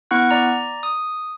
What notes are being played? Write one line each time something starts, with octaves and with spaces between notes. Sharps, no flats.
B3 E4 F#5 C#6 F#6
D5 A#5
D#6